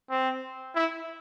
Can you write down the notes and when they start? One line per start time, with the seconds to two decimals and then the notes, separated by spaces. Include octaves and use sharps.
0.10 C4
0.75 E4